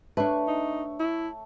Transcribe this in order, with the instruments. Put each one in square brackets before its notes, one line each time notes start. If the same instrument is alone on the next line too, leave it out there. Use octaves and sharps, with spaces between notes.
[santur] A3 C#5 [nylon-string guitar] D4 B4
[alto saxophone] D#4
E4